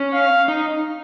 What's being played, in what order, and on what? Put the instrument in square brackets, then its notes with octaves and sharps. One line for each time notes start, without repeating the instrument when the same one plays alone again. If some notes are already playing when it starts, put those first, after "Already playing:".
Already playing: [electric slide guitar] C#4
[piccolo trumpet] F5
[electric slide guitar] D#4